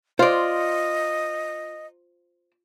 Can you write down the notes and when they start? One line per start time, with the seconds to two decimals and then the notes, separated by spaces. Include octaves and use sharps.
0.19 F4 C5 D5 D#5